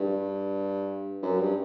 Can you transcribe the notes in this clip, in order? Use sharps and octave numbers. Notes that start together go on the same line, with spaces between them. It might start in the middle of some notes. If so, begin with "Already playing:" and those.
Already playing: G2
F#2
G2